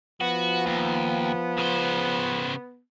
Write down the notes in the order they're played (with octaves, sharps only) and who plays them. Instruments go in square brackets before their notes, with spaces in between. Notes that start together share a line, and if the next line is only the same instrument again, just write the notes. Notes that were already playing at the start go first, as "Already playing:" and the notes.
[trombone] F3 [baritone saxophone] B3 [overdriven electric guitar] F#4
[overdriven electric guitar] D#2
C#3 C5